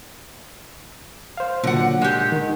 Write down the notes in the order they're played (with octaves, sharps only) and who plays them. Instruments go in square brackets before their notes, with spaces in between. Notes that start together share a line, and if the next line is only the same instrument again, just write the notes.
[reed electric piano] C5 F5
[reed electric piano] A#2 F#3 [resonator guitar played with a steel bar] D3 F#5
[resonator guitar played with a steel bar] G#3 G4 [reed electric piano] F#5
[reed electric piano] D#3